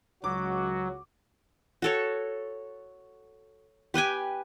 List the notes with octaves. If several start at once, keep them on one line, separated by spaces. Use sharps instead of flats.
C#2 F#3 F#4 D6
F#4 A4 C#5
G4 B4 G5 G#5